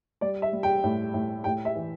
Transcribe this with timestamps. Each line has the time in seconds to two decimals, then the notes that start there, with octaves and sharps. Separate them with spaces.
0.21 G3 D5
0.42 E5
0.53 G3
0.63 G5
0.84 A2
1.14 A2
1.44 A2 G5
1.65 E5
1.76 E3